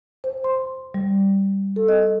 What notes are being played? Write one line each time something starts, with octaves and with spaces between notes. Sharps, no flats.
C5
C6
G3
A4
D#5